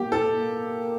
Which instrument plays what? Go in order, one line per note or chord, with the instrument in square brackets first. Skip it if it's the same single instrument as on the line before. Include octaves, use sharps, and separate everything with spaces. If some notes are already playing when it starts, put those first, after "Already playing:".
Already playing: [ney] A#3 [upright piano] G4
[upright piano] A4
[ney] A#3